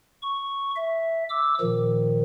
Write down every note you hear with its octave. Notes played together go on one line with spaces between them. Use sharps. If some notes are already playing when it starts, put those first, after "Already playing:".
C#6
E5
D6 E6
A#2 D#3 F3